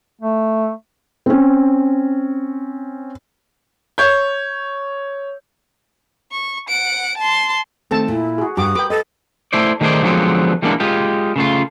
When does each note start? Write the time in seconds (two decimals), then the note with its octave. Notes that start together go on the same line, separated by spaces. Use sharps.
0.21 A3
1.26 C4 C#4
3.98 C#5 G6
6.32 C#6
6.68 F#5 D7
7.18 A5 C6
7.91 D#3 A3 C4 A4 A5
8.08 A#2 E4
8.38 F#4 G#4
8.57 G2 F#4 G4 D6 D#6
8.75 A#4 B4 G5 D6
8.90 A4 B4 D#5
9.53 A3 E4 C5 D5
9.81 D#3 A3 G#4 A4 C5 D5
10.02 D3 F3 F#3 G#3 B3 C4
10.62 E3 G3 G#3 A#3 B3 D4
10.80 G#3 F4 G4
11.36 C#3 A3 F4